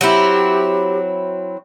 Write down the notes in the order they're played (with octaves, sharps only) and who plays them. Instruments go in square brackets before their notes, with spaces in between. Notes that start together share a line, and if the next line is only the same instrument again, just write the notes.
[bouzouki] F#3 C4 E4 [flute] G4